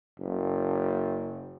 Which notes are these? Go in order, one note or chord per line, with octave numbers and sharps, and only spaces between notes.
F#1